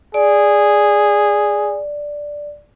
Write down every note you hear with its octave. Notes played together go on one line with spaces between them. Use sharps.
G#4 D5